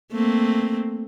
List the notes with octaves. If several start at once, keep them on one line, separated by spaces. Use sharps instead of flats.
A3 A#3 C4